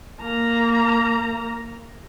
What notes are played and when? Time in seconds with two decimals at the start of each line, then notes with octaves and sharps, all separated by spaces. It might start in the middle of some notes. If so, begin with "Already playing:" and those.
0.22 A#3 A#5